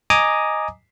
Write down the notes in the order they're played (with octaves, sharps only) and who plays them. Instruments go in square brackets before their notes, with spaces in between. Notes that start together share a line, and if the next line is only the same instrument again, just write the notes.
[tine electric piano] D#5 G#5 A#5 D6 D#6